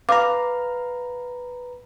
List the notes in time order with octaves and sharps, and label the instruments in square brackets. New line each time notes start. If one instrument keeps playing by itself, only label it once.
[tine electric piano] B4 A#5 [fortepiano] F5 [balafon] D6